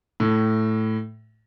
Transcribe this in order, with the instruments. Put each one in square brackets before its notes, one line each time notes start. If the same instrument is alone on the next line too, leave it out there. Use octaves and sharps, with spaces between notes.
[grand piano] A2